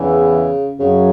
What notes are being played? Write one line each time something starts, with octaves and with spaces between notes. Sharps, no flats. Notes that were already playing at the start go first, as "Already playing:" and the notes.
Already playing: E2 C#3 E3
F#2 C#3 F#3